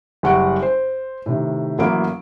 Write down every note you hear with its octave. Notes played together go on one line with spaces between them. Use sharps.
F#1 G3 F#5 C#6 D7
C5
A2 C3 D#3
A1 F#3 A#3 E4 D7